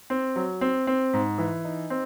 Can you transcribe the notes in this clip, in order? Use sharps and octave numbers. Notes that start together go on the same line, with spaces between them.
C4
F#3
C4
C4
G#2
E3
D#4
C4